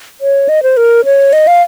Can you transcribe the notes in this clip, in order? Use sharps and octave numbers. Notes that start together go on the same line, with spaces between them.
C#5
D#5
C5
A#4
C#5
D#5
F5